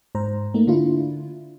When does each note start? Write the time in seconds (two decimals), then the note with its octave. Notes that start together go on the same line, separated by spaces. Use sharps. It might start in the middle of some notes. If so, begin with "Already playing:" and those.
0.15 G#2 C5 A#5
0.54 A3 A#3 D#4
0.67 D3 D4 E4 F4